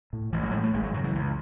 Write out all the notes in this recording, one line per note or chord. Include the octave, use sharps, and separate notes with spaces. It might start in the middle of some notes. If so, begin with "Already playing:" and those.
A2
A1 E3
F#3
A2 G#3
A3
G#1 G#3
F#3
F#2 C#3 F#3
E3
C#2